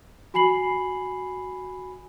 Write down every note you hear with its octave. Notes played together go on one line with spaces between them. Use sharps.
F#4 G#5 B5 C7 F#7